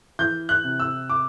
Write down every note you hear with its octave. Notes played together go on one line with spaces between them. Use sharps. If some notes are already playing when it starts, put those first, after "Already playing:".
E3 G6
F#6
C3
E6
D6